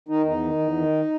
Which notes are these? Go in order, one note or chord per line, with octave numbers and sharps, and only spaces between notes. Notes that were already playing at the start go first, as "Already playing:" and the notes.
D#3 D#4
E2 D#4
D#3
E2
D#3